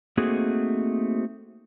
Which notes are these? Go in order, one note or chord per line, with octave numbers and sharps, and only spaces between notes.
A3 A#3 C4 D#4 F#4 G#4